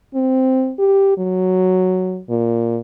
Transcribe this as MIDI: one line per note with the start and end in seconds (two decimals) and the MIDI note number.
0.15 0.73 60
0.79 1.13 67
1.18 2.20 54
2.29 2.79 46